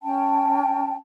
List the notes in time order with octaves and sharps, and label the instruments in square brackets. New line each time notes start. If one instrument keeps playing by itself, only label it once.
[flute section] C#4 G5 A5